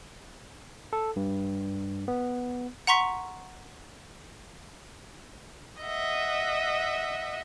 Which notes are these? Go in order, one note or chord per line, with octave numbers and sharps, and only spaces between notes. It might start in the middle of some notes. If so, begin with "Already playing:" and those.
A4
G2
B3
F#5 A#5 C6 C#6 B6
D#5 E5 F#5